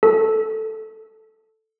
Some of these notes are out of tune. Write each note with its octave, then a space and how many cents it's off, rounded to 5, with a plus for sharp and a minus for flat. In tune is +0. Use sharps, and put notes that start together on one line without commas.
A4 +0